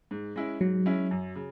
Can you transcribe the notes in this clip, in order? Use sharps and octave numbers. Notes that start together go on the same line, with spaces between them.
G#2
G#3 C#4 E4
G#2 F#3
G#3 C#4 E4
F#2
C#3